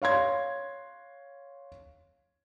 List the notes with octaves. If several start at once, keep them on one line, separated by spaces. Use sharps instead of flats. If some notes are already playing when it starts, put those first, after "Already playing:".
C#5 F5 C6 G#6